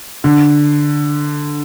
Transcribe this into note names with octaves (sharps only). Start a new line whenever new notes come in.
D3